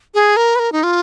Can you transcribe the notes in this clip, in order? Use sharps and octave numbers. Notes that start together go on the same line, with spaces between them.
G#4
A#4
B4
A#4
D#4
F4